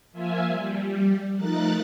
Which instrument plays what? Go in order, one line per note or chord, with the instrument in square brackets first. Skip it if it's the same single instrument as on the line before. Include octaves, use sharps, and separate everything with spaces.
[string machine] F3 A#3 F4 E5 G#5
G3
F3 A3 D#4 A#4 F#6 A6